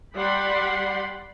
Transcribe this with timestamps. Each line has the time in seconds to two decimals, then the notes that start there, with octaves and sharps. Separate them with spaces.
0.16 G3 D5 F#5 G5 B5 C6